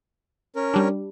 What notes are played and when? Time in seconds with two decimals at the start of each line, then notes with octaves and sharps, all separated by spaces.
0.56 C#4 A#4
0.74 G3 D4